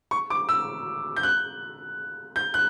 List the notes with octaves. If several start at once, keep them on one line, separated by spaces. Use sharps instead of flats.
C#6
D6
E6
G6
F#6
G6
F#6